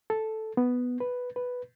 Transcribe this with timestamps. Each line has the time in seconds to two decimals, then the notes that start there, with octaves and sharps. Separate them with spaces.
0.10 A4
0.57 B3
1.00 B4
1.36 B4